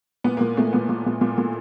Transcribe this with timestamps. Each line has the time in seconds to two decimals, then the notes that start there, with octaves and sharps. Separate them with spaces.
0.24 A#2 B3
0.37 A#3
0.41 A#2
0.57 A#2 A3 A#3
0.73 A#2 B3
0.89 A#2
1.06 A#2
1.21 A#2
1.38 A#2